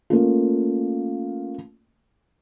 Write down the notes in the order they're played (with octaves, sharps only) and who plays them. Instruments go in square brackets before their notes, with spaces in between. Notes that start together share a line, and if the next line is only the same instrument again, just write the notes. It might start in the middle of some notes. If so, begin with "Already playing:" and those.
[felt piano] A3 A#3 C#4 F4